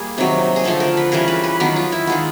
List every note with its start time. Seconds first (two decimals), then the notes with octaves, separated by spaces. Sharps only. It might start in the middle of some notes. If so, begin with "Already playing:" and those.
Already playing: G3 A#3 G#4
0.18 C3 D#3 F#3
0.56 G#4
0.64 D3 F3 A3 A4
0.80 A#4
0.97 B4
1.12 C#3 E3 G3 A#4
1.28 B4
1.44 B4
1.60 D#3 F#3 B3 A#4
1.76 F4
1.92 E4
2.07 D#3 G#3 B3 F4